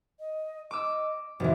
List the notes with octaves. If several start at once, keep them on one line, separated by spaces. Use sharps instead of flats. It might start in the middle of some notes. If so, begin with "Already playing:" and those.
D#5
D#5 D6 E6
F1 E3 F#4